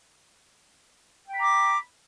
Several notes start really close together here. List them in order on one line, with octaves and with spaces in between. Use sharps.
G5 B5 A#5 D6